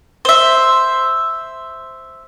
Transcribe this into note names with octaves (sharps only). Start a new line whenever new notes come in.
C5 E5